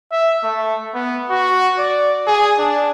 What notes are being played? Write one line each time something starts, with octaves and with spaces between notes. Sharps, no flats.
E5
A3
B3
F#4
D5
G#4
D4